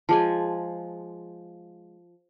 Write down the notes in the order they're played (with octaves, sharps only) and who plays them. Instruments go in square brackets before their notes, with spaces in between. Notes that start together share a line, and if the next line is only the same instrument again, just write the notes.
[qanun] F3 G#3 G#5 [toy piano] G#4 A5